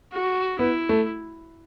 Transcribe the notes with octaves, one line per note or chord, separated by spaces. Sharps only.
F#4
B3 E4
A3